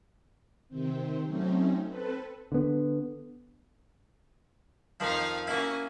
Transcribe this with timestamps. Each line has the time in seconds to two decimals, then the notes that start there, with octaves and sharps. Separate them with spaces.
0.69 C3 D#3 C4
1.25 F#3 A3 C4 C#4 D#4
1.88 C4 A4 B4
2.52 D3 B3
5.00 F2 D#3 F3 D#4 F5
5.47 A#3 C#4 E4 F#4